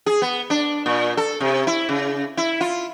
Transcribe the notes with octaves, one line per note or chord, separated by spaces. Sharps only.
G#4
B3
D4
A#2
A4
C3
E4
C#3
E4
F4